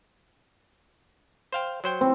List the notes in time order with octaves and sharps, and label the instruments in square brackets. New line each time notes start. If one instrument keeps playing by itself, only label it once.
[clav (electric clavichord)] C5 F5 G5
F#3 C5 G5
[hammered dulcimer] C4